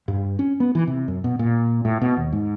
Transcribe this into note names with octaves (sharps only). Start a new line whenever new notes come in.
G2
C#4
B3
E3
C3
F#2
B2
A#2
A2
B2
D#2
G#2